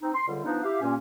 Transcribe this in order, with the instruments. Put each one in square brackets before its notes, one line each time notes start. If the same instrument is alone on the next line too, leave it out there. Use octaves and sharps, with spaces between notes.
[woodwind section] C4 D#4
C6
C#2 D3 G3
E3 F3 B3 D4 D#4
E4 G4 E5 F5
G2 A#2 A#3 C#4